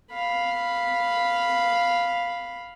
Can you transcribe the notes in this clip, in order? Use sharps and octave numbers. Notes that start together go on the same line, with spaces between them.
F5 B5